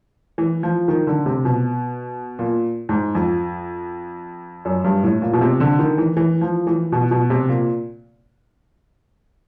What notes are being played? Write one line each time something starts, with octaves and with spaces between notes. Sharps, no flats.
E3
F3
D#3
D3
C3
B2
A#2
G#2
F2
F#2
G2
A2
A#2
B2
C3
D3
D#3
E3
E3
F3
E3
B2
B2
C3
A#2